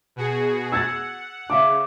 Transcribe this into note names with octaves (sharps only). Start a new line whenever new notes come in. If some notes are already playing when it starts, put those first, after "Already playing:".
B2 F#4 G#4
F#5 E6 G#6 A6
C#3 E5 F5 D6